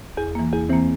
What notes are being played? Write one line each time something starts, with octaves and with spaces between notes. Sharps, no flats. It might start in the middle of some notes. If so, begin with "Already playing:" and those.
E2 G#4
E3 A#3
E2 G#4
E3 A#3 C4